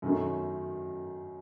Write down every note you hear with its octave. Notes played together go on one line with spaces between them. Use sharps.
F#2 D#3 F#3 A3